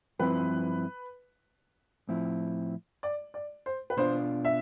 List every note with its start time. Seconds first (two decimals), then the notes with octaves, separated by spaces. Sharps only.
0.19 G2 F3 C4 E4 B4
2.09 A2 F3 C4 E4
3.03 D5
3.34 D5
3.66 C5
3.90 B4
3.97 B2 B3 D4 F4 C5
4.45 E5